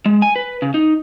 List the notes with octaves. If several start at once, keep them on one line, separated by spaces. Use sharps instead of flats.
G#3
G#5
B4
C#3
D#4